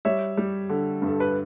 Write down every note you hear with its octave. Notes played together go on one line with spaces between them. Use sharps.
G3 C#5 E5
G3
D3
G2
A4
B4